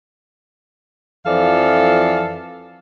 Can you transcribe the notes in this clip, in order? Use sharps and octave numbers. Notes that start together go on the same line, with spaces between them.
F2 E3 F3 A4 D5 F5